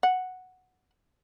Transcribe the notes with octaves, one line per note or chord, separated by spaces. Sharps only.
F#5